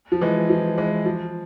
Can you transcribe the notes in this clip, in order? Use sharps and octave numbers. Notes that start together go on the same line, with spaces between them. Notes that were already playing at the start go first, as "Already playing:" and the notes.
F3
E3 G#3
F3
E3 G#3
F3